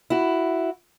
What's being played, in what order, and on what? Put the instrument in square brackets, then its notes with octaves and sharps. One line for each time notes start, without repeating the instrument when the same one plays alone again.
[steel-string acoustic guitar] E4 F#4